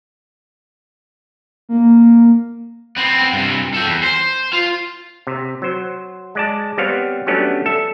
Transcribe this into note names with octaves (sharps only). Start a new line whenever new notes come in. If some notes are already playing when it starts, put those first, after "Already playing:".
A#3
B3 C4
G2 C3
A4 G5
E2
C5
F4
C3
F#3 C5
G#3 D5 A5
G3 B3 C4 C#5 F5
F#3 G3 A3 B3 C#4 D4
A4 E5